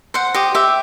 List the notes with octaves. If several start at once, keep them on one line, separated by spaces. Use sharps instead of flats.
C5 F#5
G4 D#5
G4 E5